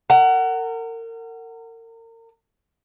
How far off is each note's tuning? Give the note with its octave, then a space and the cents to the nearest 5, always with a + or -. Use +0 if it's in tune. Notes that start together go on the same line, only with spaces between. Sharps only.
A#4 -35 F#5 +15